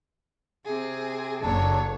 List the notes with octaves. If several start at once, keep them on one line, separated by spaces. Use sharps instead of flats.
C3 C4 G#4
F#1 F#3 D4 A4 C#5